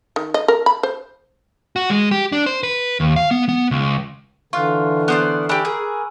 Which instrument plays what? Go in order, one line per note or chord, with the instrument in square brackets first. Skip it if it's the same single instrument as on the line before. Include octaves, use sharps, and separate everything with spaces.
[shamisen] D#3
D#5
A#4
B5
C5
[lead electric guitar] F#4
G#3
G4
D4
C5
B4
D#2
F5
B3
B3
C#2
[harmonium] D3 E3 [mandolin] F4 [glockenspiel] C#6 F6 F#6
[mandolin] B3 C5 D5 [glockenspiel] D6 F#6 D7
[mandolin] D4 G4 [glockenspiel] G#5 B5 E6
[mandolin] G#4 [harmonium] A#4